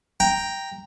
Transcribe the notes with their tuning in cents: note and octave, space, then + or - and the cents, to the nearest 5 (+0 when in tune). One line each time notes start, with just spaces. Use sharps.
G5 +0 A#5 +0